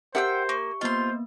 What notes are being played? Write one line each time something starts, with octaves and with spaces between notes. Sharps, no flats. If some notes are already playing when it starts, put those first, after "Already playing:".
G4 A#4 C5 E5 F#5 G5 E6
A#3 C#6
A#3 B3 F4 C5 D#5 C6